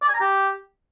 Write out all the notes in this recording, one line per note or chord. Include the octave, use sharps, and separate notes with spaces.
D5
G#5
A#5
G4